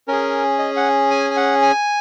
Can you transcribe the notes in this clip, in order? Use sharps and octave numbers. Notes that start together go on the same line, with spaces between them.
C#4 G#4 A#4
D#5
F#5
G#5
G#5
F#5
G#5